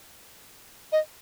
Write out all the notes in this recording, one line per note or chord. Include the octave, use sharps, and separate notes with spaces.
D#5